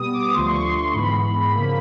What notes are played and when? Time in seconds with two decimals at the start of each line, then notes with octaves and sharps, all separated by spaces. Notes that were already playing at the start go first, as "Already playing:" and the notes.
Already playing: B2 G3 B3 D#6
0.13 D6
0.33 D2 D3 F3 A3 C6
0.46 C#6
0.60 C6
0.94 G#2 E3 G#3 B3 B5
1.54 C#3 F3 A#3